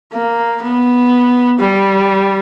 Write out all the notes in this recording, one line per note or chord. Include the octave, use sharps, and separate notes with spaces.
A#3
B3
G3